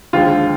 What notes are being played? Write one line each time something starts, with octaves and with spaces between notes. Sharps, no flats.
D#2 D3 F3 G#3 F4